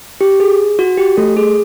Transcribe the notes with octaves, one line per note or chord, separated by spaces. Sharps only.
G4
G#4
F#4
G4
A3 A4
G#4